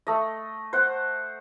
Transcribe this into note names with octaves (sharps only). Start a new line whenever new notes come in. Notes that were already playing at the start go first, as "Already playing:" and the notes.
A3 D#5
C5 F#5